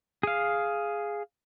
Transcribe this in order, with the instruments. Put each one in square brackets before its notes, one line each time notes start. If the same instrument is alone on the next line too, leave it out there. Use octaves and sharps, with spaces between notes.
[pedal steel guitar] G#4 F5